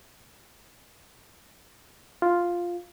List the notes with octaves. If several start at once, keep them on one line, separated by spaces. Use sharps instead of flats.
F4